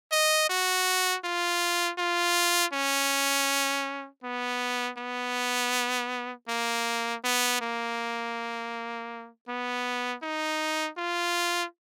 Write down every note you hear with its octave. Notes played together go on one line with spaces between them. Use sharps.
D#5
F#4
F4
F4
C#4
B3
B3
A#3
B3
A#3
B3
D#4
F4